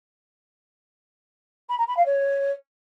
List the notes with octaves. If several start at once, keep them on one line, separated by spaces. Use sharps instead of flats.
B5
A#5
B5
F5
C#5